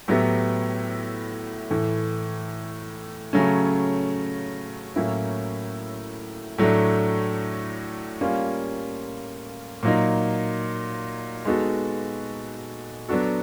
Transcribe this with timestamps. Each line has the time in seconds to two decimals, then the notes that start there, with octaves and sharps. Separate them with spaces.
0.08 A2 F#3 B3 E4 G4
1.70 A2 E3 A3
3.33 C#3 F#3 A3 C#4
4.96 A2 F#3 A#3 C#4 E4
6.58 A2 F#3 A3 D4
8.21 G3 A#3 C#4 F4
9.83 A#2 F#3 A#3 D#4
11.45 G#3 B3 D#4 F#4 A4
13.09 F#3 B3 D4 F#4 A4